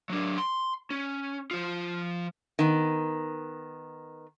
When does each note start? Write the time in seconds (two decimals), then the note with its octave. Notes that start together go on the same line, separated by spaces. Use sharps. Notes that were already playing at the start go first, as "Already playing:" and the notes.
0.10 F#3 D4
0.38 C6
0.90 C#4
1.51 F3 F4
2.59 D#3 B3